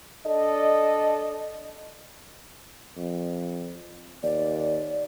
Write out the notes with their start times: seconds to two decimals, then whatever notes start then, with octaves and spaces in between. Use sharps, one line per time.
0.27 D4 A4 D5 D#5
2.97 F2
4.23 D#2 D5